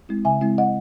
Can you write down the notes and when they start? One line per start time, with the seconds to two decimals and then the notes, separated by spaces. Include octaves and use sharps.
0.09 G#3 C4 E4
0.25 C#3 E5 G#5
0.41 G#3 C4 E4
0.58 D#5 F#5